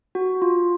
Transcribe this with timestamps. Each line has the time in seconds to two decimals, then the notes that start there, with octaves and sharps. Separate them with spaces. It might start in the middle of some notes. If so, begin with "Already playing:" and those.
0.15 F#4
0.42 F4